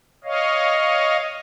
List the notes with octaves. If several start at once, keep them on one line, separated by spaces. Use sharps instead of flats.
C#5 D#5 F5